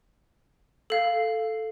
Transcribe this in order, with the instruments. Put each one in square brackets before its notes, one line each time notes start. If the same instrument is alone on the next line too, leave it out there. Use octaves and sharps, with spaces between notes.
[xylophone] A4 F5